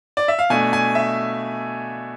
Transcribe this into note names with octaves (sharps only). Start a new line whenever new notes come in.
D5
E5
F5
B2 A3 D4 G#5
G#5
E5